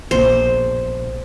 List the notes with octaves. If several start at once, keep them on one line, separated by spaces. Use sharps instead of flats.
A#1 B2 C5